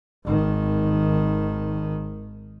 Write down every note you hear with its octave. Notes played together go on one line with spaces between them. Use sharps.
G#1 D#3